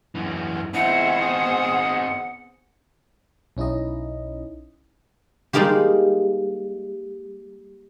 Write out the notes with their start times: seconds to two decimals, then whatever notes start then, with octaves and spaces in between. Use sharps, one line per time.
0.15 F#2 E3
0.74 B3 C4 D#4 E4 G#4 C5 F#5
1.20 D#6
3.57 B1 C#4 D#4 E4 D#5
5.53 G3 G#3 A#3 D#4 F4 G4